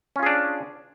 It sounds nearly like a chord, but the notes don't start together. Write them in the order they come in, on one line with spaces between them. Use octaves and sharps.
C#4 F4 G#4 D4